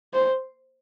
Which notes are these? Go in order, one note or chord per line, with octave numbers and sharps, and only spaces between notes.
C5